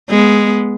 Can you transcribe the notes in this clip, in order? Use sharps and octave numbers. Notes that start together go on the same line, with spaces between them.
G#3 B3